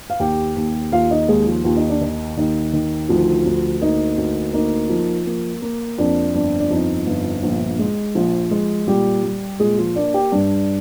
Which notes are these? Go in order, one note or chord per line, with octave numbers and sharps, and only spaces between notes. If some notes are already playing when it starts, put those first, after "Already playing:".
F5
D#2 G4 G5
D#2
D#2 F4 F5
D#4 D#5
D#2 G#3 G#4
F3 F4
D#2 F4
D#4
D4
D#3 D#4
D#2 D#4
D#3
D2 F3 F4
D2
A#3 D#4
D2
A#3 D#4
F3
A#3
A#3
F2 D4
G1 D4
D4
F2 D#4
G1
A#1
G#3
A#1 F3 F4
G#3
A#2 G3 G4
G3
A#2 G#3 G#4
F3 F4
A#3 D4 D5
G4 G5
G2 D4 D5